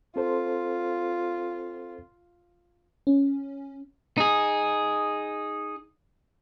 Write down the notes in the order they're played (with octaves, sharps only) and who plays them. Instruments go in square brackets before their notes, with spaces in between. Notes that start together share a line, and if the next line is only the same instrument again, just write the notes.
[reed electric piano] C4 A4 C5 [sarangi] F4
[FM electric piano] C#4
[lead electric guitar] D#4 G#4